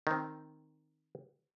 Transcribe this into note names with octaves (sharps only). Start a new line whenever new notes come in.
D#3 C4